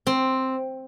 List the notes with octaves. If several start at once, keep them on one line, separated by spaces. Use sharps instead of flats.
C4